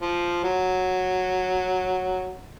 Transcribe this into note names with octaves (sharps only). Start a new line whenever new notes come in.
F3
F#3